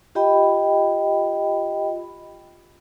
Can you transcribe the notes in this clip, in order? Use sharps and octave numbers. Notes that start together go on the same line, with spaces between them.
F4 G4 D#5 G5 B5